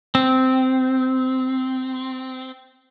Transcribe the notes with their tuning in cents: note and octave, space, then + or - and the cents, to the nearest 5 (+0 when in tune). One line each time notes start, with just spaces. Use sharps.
C4 -10